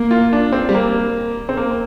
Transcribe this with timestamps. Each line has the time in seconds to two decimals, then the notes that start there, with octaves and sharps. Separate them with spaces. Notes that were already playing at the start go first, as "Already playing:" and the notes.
Already playing: A#3
0.11 F4
0.33 D4
0.52 C4
0.69 G3
0.74 A#3
1.49 C4
1.57 A#3